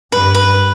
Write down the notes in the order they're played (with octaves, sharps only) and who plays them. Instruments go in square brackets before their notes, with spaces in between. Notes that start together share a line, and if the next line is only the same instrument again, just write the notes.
[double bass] G2 [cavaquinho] B4
[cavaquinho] B4